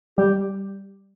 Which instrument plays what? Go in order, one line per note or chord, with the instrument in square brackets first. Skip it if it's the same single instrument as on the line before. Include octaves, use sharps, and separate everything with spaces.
[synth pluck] G3 [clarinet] G4